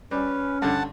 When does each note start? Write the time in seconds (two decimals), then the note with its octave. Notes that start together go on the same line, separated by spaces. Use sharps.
0.11 G3 C#4 B4
0.62 G2 D3 F#5 A5